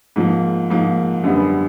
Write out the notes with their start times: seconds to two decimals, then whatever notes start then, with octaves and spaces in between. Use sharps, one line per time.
0.16 G#2 F3 A#3
0.70 G#2 F3 A#3
1.24 F#2 D3 G3 B3